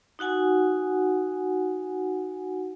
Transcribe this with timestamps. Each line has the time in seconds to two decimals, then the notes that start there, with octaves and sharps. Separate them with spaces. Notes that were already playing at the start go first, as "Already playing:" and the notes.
0.19 D#4 F#4 F#5 G#5